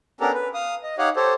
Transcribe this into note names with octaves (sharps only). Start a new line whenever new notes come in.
B3 C#4 D4 G4 A4 A#4
B4
F5 D#6
D#5
D#4 G4 C#5 F5 F#5
G4 A4 C5 C#5